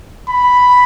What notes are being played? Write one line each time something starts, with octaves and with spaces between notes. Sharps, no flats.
B5